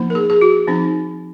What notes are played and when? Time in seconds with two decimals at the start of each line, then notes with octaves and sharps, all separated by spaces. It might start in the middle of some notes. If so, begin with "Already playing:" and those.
Already playing: F3 A#3 D#4
0.10 A#4
0.15 G#4
0.30 G#4
0.41 F#4
0.67 F3 C4 D#4